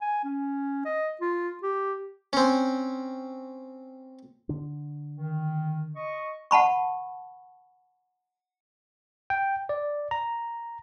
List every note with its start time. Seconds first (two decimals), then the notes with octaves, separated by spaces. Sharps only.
0.01 G#5
0.24 C#4
0.85 D#5
1.21 F4
1.63 G4
2.33 C4 C#4
4.49 D3 D4
5.17 D#3
5.96 D#5 C#6
6.51 F#5 A5 B5 C#6
9.30 G5
9.69 D5
10.11 A#5